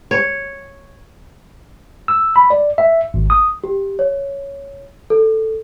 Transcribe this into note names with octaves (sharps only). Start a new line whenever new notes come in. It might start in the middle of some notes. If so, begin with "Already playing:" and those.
C#5
E6
B5
D5
E5
G#1
D#6
G4
C#5
A4